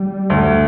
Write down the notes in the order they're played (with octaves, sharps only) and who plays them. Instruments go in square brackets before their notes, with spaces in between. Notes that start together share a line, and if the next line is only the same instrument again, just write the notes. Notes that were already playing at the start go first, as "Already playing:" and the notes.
Already playing: [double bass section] G3
[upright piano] D2